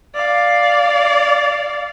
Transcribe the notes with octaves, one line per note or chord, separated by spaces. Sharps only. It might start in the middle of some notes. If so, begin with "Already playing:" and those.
D5 F5